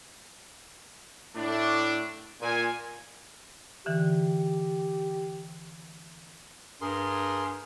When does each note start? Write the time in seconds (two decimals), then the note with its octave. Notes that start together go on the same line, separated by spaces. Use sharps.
1.35 A2 A3 D4
2.41 A#2 G#5
3.86 D3 E3 G4
6.82 G2 G#4 A#4 C6